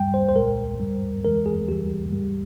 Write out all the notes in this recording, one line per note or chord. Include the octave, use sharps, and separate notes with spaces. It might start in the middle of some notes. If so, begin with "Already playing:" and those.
Already playing: G2 G3 G5
C5
C5
C2 A#2 G#3 A#4
G#2 G3
F2 E3 G#3 A#4
G#4
E2 E3 G3 G4
G#2 G3